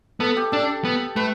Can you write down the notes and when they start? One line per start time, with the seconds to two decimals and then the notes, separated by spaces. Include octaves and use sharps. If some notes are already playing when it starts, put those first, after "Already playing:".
0.20 B3 A4
0.37 G4
0.52 D4 A4
0.85 B3
1.16 A3 B4